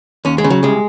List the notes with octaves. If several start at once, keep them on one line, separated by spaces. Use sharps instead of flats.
D#2 C#4
G#3
C#3
F#3
C2 G#3